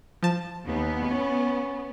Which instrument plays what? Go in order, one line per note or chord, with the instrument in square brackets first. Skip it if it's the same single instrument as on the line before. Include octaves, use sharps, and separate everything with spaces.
[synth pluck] F3 A5
[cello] D#2 [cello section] B3
[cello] C#4